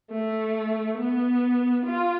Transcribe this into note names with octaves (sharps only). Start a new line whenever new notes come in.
A3
B3
F4